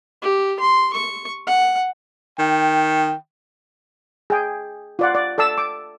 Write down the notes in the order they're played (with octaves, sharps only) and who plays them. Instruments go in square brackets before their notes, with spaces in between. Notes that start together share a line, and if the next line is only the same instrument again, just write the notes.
[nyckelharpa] G4
C6
C#6
F#5
[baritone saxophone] D#3 [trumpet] G5
[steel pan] G#4 G5
F4 D5 F#5
D5
A4 D5 A5 E6
D6